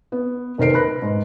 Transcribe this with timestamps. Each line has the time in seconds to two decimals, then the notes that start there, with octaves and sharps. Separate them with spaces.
0.12 B3
0.58 F1 D#3 A#4 C5 C7 D7
0.73 B4 B5 F#6 A#6
1.02 G#2